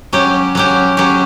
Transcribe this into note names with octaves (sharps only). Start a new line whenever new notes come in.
F#3 C#4 G4
F#3 C#4 G4
F#3 C#4 G4